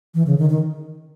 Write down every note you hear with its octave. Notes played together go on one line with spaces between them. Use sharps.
E3
C#3
D#3
D#3